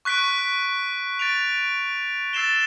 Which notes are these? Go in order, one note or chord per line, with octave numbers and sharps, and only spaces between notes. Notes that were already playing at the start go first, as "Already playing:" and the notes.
C#6 F#6 B6 D7
A6 D7 F7
E6 A6 C7 E7 G7